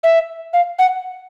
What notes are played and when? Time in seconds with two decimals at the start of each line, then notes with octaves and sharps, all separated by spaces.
0.03 E5
0.53 F5
0.79 F#5